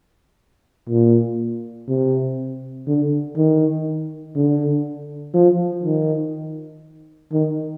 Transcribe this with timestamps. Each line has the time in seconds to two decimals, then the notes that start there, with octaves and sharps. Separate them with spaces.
0.89 A#2
1.88 C3
2.88 D3
3.37 D#3
4.36 D3
5.34 F3
5.84 D#3
7.33 D#3